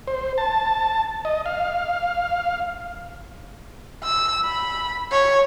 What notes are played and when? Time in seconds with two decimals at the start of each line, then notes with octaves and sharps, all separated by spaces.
0.08 C5
0.38 A5
1.25 D#5
1.46 F5
4.03 E6
4.45 B5
5.11 C#5